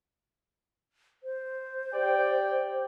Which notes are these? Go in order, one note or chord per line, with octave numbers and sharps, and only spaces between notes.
C5
G4 D5 G5